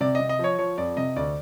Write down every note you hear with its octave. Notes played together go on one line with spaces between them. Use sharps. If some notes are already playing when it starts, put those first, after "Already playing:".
C3 D5
C3 D#5
D#5
F3 C#5
F3 C#5
F2 D5
C3 D#5
D2 D5